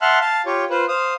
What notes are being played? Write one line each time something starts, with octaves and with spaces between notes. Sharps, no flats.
E5 F#5 A5 C6 F6 F#6
F5 A5
F4 G4 C#5
F4 B4 C5
C5 F5 D#6